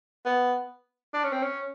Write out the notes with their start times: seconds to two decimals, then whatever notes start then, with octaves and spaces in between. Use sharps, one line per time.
0.25 B3
1.14 D4
1.23 C#4
1.32 C4
1.42 C#4